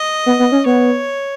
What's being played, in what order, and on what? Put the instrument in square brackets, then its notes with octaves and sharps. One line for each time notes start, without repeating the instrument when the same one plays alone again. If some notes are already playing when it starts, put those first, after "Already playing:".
Already playing: [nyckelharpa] D#5
[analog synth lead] B3
B3
C#4
[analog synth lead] B3 [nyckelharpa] C#5